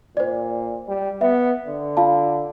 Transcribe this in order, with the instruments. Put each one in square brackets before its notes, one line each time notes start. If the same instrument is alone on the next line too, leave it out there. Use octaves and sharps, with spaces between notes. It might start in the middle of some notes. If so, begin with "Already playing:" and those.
[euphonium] A#2 [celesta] C5 D5
[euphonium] G3
[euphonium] B3 [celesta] E5
[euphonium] D3
[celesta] F4 F5 A5